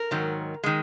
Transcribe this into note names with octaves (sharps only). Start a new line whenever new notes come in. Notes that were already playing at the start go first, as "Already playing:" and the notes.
Already playing: A#4
G#2 D#3 F#3
D#3 G#3